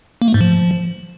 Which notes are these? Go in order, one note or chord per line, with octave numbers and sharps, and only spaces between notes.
A#3
A3
G#2
F3